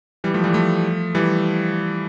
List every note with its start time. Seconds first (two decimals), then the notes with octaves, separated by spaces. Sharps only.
0.24 E3 G3
0.34 F3 A3
0.44 E3 G3
0.54 F3 A3
1.15 E3 G3